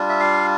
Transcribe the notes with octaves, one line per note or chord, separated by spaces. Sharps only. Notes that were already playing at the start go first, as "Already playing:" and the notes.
Already playing: G3 D4 F4
E5
F5